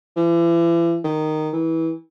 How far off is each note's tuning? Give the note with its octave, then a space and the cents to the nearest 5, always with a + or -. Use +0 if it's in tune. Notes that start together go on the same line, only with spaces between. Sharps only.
E3 +40
D#3 -10
E3 -20